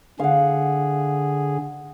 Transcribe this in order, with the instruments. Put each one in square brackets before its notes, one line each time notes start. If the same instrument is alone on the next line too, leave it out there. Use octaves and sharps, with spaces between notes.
[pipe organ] D3 G#4 [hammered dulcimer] F5 F#5